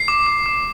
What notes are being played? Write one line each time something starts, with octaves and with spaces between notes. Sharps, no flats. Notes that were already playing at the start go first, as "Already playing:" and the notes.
Already playing: C7
D6
D6
D6